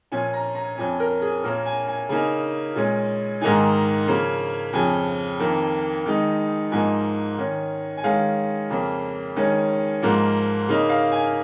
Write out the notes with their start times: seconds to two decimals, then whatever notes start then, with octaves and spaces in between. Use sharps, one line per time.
0.12 A#2 F3 C#4 G#5
0.34 A#5
0.55 A#5
0.77 F2 F3 C#4 G#5
1.00 A#4
1.22 G#4
1.44 A#2 A#3 C#4 A#4
1.66 G#5
1.88 G#5
2.09 C#3 A#3 D#4 G#5
2.75 A#2 G#3 C#4
3.41 G#2 D#3 A#3 D#4 G#5
4.08 C#3 F3 A#3 C#4
4.73 F2 C#3 F3 G#5
5.39 F2 D#3 A#3
6.06 D#3 G#3 D#4
6.72 G#2 F3 A#3 D#4 G#5
7.38 D#3 C#4
7.97 G#5
8.04 D#3 G#3 C#4 F5
8.70 F2 C#3 A#3
9.36 D#3 G#3 C#4
10.02 G#2 F3 A#3
10.68 C#3 A#3 D#4
10.89 F5
11.12 G#5